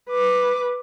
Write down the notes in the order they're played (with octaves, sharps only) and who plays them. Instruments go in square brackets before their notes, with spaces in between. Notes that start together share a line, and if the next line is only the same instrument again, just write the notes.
[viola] B4 D6